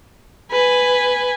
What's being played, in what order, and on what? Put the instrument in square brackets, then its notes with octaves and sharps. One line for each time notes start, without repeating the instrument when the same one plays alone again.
[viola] B4 G#5